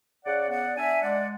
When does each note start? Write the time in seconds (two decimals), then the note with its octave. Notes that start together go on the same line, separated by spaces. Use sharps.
0.25 C#3 D5 F#5
0.50 B3 D5 F#5
0.76 D4 E5 G#5
1.02 G#3 D5 F#5